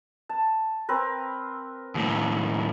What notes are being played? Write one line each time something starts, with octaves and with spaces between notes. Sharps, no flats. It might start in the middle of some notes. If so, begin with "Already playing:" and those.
A5
C4 A#4 B4
D#2 A2